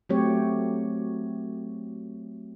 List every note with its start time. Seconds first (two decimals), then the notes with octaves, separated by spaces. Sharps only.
0.09 F#3 A3 C4 G4 C#5